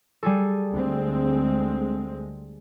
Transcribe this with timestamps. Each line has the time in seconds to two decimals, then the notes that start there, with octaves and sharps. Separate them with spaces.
0.23 G3 G#4 A4
0.70 D2 G#3 C4